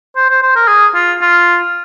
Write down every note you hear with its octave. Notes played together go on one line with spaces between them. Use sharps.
C5
C5
C5
A#4
G#4
F4
F4